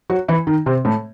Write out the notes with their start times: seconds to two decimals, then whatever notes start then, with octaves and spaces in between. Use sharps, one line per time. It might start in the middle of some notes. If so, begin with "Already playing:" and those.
0.10 F#3 F#4
0.28 E3 E4
0.47 D#3 D#4
0.66 C3 C4
0.85 A2 A3